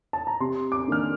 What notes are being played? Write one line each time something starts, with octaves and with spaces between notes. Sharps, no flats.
A5
A#5
C3 C6
D6
D#3 A#3 D4 F6